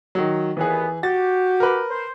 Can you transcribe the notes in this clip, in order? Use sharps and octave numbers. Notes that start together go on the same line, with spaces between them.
D#3 F#3
D#2 E3 B3 G#4
F#4 G4 A6
A#4 B4
C5